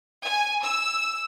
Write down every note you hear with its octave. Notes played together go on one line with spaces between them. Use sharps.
G#5
E6